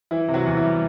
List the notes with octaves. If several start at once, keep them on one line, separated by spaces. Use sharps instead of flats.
E3 E4
C3
F#3 F#4
E2
E4
G3